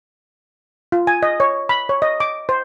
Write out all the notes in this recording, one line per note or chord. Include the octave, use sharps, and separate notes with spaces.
F4
G#5
D#5
C#5
B5
C#5
D#5
D6
C5